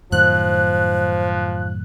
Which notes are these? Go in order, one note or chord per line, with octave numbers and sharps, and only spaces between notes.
F#2 A2 D#3 F3 C5 F#6